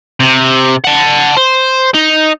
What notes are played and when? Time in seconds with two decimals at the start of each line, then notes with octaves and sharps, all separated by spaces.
0.20 C3
0.84 F#5 A5
1.37 C5
1.94 D#4